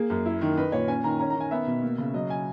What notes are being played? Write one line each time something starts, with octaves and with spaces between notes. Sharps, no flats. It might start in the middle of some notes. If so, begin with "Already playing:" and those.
Already playing: A#3 G#4
F#2
E4
D#3
D#4 B4
A#2 C#5
C#4 G#5
D#3 A#5
C#4 A#5
A#5
D#3
G#5
B3 E5
B2
A#3
C#3
F#3 D#5
G#5